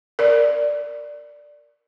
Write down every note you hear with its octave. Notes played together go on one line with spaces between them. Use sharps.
A#4 D5